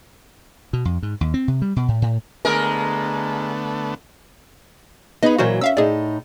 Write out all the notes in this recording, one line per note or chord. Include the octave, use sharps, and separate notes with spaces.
B2
F2
G#2
D#2
C4
C3
G3
B2
A2
A2
D3 G#3 A3 B3 A#4
B3 D#4 G#4 D#5 B5
A#2 E3 F#3 F#4 A#4 C5
C#4 E5 F5 E6
A2 D#4 G#4 D5